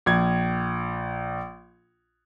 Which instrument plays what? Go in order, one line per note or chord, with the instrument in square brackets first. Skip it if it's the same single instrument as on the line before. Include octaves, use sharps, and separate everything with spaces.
[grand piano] A#1 G#6